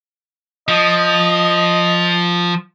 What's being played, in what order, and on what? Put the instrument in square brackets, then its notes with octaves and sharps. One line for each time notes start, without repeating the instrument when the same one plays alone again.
[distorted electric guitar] F3 [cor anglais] D#5